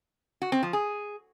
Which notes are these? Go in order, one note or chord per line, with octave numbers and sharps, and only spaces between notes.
F#4
C4
F3
G#4